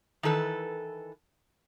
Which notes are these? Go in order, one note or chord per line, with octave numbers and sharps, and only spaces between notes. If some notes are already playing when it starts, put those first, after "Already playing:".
D#3 E3 A4 B4